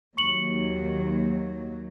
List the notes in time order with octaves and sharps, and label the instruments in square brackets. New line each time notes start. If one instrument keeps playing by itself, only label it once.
[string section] D#2 F#3 [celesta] C#6 C#7 F#7